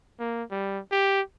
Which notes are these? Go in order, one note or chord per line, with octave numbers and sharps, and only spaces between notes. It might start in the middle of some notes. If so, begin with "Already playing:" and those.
A#3
G3
G4